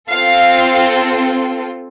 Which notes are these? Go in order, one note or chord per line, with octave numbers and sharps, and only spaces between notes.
C4 F4 A4 F5